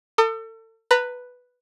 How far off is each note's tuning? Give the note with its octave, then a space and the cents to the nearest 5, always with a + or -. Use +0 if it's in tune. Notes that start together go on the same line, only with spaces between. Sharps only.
A4 +35 D#6 -25
B4 +0 A#5 -30